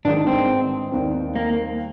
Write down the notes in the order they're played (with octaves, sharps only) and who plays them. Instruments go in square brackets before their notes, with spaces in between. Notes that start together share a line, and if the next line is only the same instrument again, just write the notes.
[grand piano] G#1 G2 D#3 G#3 D#4 [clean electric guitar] D4
[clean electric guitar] C4
[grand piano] D#2 D#3 G3 C4
[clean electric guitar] A#3